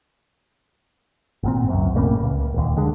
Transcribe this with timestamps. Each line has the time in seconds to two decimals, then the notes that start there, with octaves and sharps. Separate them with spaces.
1.43 G#1 A#2 C4
1.69 C#2 F#2
1.95 A#1 A2 C#3 A#3
2.22 C#2
2.54 D#1 D#2
2.76 D#2 D3 G#3